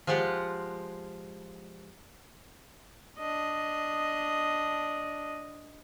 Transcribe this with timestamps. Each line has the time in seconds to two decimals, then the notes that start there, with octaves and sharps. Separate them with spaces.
0.07 F3 G#3 F4 G4 F#5
3.19 D4 D#5